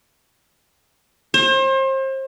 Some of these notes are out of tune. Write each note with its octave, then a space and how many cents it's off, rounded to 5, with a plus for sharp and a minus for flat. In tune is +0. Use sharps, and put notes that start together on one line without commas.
C5 +35